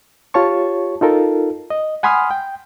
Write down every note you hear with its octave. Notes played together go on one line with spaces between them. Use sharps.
F4 G4 C#5 A5 C#6
D#4 F4 A4 A#4
D#5
F#5 G#5 B5 C6 D#6 F6
G5